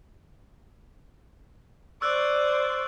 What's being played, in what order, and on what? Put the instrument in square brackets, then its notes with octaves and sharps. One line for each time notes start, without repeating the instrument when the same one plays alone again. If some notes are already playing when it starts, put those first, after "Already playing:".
[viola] C5 D5 [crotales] C#6 E6 F#6